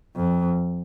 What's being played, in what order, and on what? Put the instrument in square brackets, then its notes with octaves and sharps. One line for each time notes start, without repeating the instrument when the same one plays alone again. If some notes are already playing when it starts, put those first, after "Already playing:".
[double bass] F2